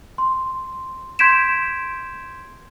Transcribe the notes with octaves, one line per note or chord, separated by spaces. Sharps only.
C6
C6 G6 G#6 B6 D7 E7